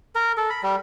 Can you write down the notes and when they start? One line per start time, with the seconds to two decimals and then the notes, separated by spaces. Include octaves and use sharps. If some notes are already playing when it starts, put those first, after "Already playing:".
0.15 A#4
0.37 A4
0.50 B5
0.63 G3